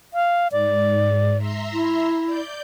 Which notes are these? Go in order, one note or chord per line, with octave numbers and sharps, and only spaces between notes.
F5
G#2 D5
E5 A#5 C6
E4
D5 G6